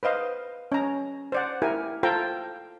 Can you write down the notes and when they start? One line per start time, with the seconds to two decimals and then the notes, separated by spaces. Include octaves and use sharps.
0.03 B4 C5 D#5 F5
0.72 C#4 A#5
1.32 C5 D5 F#5
1.62 E4 G4 A#4 G#5
2.03 F4 A4 C5 G5 A5 A#5